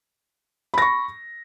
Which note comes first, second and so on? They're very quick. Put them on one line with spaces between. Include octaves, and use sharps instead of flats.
B5 A#6 C#6